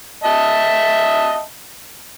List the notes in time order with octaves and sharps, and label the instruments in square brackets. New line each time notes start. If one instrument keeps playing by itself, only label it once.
[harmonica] D#5 E5 A5